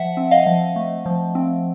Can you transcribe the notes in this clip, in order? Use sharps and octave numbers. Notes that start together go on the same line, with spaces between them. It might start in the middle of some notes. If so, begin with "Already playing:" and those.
Already playing: F3 E5 F#5
C4
D#5 F5
F3
A3
F3
C4